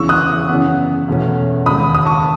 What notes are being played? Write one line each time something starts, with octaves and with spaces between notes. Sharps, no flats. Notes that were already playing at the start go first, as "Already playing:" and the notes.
Already playing: E2 C#3 E3 C#6 E6
D#6 F#6
F#2 C#3 E3 B3
E2 B2 A3 C#4
D#2 C#3 G#3 C#4 B5 D#6
D#6
A5 C#6